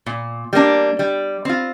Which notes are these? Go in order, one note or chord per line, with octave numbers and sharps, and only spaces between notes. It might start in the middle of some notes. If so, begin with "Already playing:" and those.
A#2
G3 A#3 D4
G3
C4 F4